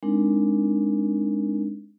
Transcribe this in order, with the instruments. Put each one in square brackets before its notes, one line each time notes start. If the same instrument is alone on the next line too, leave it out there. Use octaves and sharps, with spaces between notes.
[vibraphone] G#3 C4 D4 D#4 A#4